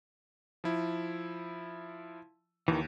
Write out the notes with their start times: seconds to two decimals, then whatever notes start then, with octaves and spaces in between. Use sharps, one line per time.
0.64 F3 E4
2.68 D#2 D#3 E3